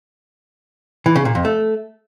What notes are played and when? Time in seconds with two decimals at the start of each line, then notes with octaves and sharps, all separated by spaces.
1.06 E3
1.16 C#3
1.25 A#2
1.35 F2
1.45 A3